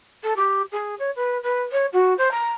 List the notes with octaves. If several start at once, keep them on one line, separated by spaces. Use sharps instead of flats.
A4
G4
G#4
C#5
B4
B4
C#5
F#4
C5
A#5